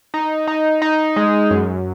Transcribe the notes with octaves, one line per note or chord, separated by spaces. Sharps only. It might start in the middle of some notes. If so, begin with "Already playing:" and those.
D#4
D#4
D#4
G#3
F#2